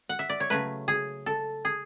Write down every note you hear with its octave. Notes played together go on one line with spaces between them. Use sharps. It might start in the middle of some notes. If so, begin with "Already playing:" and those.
F#5
E5
D5
C#5
C#3 F#3 A3 B4
G#4
A4
G#4